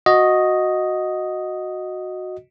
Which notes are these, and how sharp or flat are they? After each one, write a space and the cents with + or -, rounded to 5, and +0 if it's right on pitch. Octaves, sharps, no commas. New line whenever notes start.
F#4 -10 D#5 +0